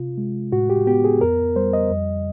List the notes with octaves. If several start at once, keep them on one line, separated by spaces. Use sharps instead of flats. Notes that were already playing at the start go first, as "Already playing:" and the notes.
Already playing: C3 F4
G#3
A2 F#4
G4
B3 G4
G#4
F2 A#4
G3 C5
D#5
F2